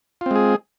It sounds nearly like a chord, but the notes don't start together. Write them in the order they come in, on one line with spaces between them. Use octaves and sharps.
F4 C4 G#3 G#4